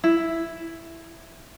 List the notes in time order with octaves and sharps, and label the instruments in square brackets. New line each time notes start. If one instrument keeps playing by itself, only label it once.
[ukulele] E4